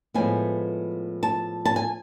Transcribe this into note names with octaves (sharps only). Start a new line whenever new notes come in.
A2 F3 G#3 B3 G#5
A5
A5
G#5